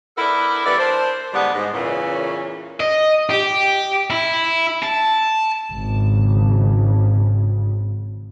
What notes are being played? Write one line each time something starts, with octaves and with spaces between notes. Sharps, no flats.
B3 D4 E4 A4 A#4
E3 G3 B3 D5
D4 A#4 C5
A2 D3 G3 G#3 B3
G#2
E2 A#2 C#3 E3 C#4
D#5
G4
E4
A5
G#1 C#3